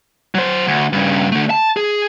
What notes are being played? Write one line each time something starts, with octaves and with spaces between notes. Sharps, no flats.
F#3 C5
D2
G2 C#3
D3 A3
A5
G#4